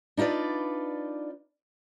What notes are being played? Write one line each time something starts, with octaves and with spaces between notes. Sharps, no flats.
D4 D#4 F4 B4 D5